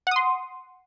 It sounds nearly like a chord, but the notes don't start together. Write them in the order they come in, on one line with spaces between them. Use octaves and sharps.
F#5 D#6 C6